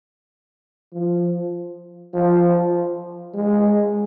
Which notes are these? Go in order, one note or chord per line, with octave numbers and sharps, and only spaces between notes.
F3
F3
G#3